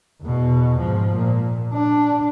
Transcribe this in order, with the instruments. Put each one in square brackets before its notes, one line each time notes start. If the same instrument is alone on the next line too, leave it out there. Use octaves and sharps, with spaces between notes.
[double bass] E2 B2
G#2 F3
A#2
D4